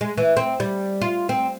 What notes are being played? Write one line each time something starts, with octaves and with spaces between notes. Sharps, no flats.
G#3
E3
C4
G3
F4
C4